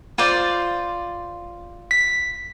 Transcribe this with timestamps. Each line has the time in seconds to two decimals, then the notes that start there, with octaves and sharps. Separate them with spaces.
0.18 F4 C5 D5
1.91 B6